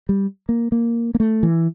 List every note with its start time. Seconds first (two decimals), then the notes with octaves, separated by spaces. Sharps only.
0.09 G3
0.49 A#3
0.72 A#3
1.15 A#3
1.20 A3
1.43 E3